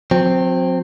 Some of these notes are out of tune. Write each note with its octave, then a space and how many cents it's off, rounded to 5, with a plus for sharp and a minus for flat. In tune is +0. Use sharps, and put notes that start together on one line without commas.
F#3 -40 C4 +0